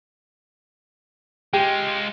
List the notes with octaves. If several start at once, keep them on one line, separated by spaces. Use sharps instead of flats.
G#3 F4 G4